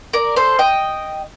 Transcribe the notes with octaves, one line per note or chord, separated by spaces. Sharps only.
A#4 D5
A4 C5
D#5 G5